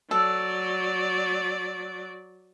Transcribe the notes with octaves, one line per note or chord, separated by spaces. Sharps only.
F#3 A4 D5